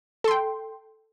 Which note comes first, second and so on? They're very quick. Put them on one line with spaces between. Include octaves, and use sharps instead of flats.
A4 C6 G5